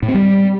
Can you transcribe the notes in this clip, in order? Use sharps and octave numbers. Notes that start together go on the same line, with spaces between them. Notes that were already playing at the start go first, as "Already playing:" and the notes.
A2
C4
G3